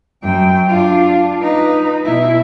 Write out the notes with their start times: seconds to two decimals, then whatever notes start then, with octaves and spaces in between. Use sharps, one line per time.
0.23 F#2 G5
0.68 D4 F4
1.42 D#4 B4
2.05 B2 E4